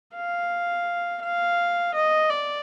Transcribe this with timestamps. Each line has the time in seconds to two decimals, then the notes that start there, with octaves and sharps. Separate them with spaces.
0.16 F5
1.22 F5
1.94 D#5
2.29 D5